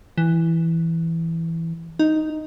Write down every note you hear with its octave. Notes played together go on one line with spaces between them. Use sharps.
E3
D#4